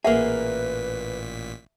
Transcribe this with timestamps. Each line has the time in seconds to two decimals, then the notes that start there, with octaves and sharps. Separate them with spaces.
0.05 A1 A#2 A#3 G#4 B4 E5 F#5 B6